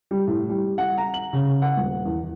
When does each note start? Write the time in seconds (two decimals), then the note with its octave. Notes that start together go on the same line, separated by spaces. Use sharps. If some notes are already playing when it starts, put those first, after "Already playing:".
0.11 G3
0.27 A2
0.49 G3
0.78 F#5
0.97 A#5
1.14 F#7
1.33 C#3
1.62 F#5
1.77 D#1
2.05 E2